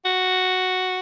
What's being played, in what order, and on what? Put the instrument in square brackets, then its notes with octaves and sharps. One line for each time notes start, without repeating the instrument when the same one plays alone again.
[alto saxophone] F#4